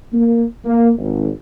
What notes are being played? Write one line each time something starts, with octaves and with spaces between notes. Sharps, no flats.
A#3
A#3
G#1